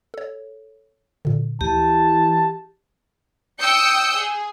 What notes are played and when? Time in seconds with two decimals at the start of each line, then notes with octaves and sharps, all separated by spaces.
0.14 A4 C#5
1.25 A#2 D3
1.61 D2 E3 G4 A5
3.59 G5 D#6 E6 G6 C#7
4.15 G#4